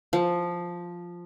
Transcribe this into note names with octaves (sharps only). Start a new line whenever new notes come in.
F3